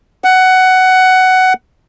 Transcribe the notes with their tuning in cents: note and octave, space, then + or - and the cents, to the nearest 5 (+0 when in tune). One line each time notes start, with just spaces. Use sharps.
F#5 +10